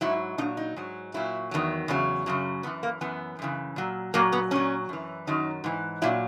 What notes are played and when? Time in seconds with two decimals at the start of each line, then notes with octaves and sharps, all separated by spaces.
0.01 G#2 F#3 E4
0.38 A#2 D#4
0.41 F#3
0.57 D#4
0.76 G#2 F#3
1.14 A#2 F#3 E4
1.51 E2 D#3 F#3
1.88 E2 C#3 F#3
2.26 F#2 C#3 F#3
2.63 F#2 E3 B3
2.83 A#3
3.01 F#2 E3 B3
3.39 F#2 C#3 E3
3.76 A#2 F#3
4.14 A#2 F#3 A#3
4.32 B3
4.51 A#2 F#3 C#4
4.89 F#2 E3
5.27 F#2 D#3 F#3 D#4
5.64 G#2 E3
6.02 A#2 F#3 E4